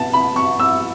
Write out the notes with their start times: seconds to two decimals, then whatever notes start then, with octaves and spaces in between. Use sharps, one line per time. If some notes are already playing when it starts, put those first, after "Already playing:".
Already playing: B2 B3 A5
0.13 B5
0.36 C#6
0.60 E6